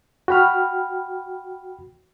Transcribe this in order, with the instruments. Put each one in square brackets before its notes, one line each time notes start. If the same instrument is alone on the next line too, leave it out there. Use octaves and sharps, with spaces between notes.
[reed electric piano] F#4 G5 B5 F6